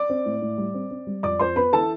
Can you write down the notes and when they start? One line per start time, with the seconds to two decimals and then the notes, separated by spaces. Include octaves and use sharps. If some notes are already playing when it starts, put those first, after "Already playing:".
Already playing: D5 D6
0.10 C4
0.25 A2
0.42 A2
0.58 G3
0.74 C4
0.91 C4
1.07 G3
1.23 F2 D5 D6
1.39 F2 C5 C6
1.56 B3 B4 B5
1.73 E3 A4 A5